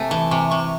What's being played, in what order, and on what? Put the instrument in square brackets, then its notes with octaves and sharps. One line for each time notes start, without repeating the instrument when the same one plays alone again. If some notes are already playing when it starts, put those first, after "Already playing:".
Already playing: [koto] C3 A3 [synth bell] G#5
[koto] E3 [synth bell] A5
[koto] C3 [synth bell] C#6
[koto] C3 [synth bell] C#6